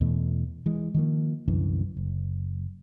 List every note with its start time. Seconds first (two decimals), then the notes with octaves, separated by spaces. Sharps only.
0.01 E2 B2 E3 A3
0.66 E3 G#3
0.94 D#3 F3 A#3
1.48 C2 F#2 D3 E3
1.97 F#1